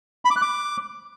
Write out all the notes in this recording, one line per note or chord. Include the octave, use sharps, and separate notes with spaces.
B5
D6
F#6
D6